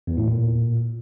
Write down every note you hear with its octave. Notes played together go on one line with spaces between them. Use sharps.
E2
A2
A#2